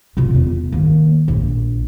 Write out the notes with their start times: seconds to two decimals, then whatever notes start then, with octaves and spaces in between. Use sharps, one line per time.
0.17 C3 F4
0.35 E2
0.72 D#3 A#3
1.28 A#1